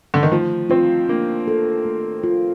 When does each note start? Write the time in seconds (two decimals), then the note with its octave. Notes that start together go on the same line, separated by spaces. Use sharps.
0.14 D3
0.23 D#3
0.32 F3 A3
0.70 C4 F4
1.08 A#3 D4
1.48 A4
1.85 A3
2.24 F4